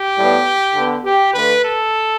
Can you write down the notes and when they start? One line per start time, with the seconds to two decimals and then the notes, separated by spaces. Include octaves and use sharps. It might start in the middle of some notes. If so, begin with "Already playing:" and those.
Already playing: G4
0.16 A2 G3 B3
0.75 D3 B3
1.04 G4
1.33 D3 A3 B4
1.63 A4